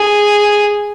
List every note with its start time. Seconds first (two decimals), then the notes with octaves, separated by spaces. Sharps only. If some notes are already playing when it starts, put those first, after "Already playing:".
Already playing: G#4